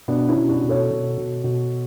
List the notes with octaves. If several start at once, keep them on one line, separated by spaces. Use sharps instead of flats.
B2 B3 D4
C#4 E4
B2
D4 F#4
B2
A4 C#5
B2
B2
B2